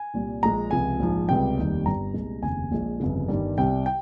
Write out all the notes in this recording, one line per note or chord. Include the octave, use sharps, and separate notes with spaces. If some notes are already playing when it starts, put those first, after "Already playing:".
Already playing: G#5
C2 A#2 G3
A#1 A#2 G#3 A#5
C#2 C3 F3 G#5
A#1 G#2 F3
C#2 C3 G3 G5
F1 D#2 D#3 G3
G1 G2 G3 A#5
C2 A#2 G#3
F1 D#2 C#3 G#5
A#1 A#2 G#3
G1 F2 C#3
G1 G2 D#3 G3
C2 C3 G3 G5
G5